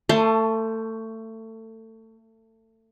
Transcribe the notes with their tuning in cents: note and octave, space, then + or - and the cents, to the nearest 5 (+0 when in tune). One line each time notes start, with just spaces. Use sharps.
A3 +25 A5 +0 C6 +0